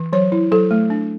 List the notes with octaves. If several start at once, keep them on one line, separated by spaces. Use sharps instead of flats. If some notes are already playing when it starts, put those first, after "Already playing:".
Already playing: E3
F#3 C#5
E4
F#3 A4
A3
D4